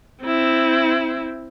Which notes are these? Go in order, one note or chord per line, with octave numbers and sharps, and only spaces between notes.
C4 E4